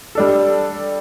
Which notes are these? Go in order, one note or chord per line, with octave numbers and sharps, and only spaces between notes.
G3 D4 A4